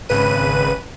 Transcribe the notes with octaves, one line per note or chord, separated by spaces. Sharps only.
G#1 C#3 B4 D#7